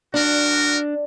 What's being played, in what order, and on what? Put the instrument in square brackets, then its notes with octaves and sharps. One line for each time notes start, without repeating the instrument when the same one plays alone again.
[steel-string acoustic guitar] D4 [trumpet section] F#4 A#4